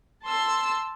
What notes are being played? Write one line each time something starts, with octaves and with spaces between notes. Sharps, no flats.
A5 C6 E6